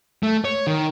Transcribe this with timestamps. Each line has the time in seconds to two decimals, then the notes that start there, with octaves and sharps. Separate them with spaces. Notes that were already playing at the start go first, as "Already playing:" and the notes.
0.23 A3
0.45 C#5
0.67 D#3